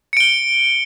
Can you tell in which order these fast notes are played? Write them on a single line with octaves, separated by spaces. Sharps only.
C#7 D7 G7